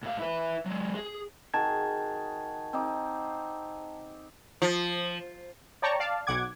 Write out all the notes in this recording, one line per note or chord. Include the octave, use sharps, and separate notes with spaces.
A2 F5
E4 B4
F#3 G#3
G#4
D#3 F#4 G#4 A5 G#6
C4 D#4 D6
F3
C#5 D5 G5 A5 A#5 C#6
D5 F5 A5
B1 F#5 D6 G#6